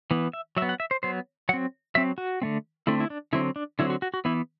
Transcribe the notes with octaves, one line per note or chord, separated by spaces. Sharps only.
E3 B3
E5
F#3 E5
B3
F#5
E5
C5
F#3 B3 C5
F#3 C4 F#5
F#3 C4 E5
F#4
D3 A3 C4
D3 A3 C4 E4
E4
D4
D3 F#3 C4 E4
D4
D3 F#3 C4 E4
F#4
F#4
F#4
E3 B3 E4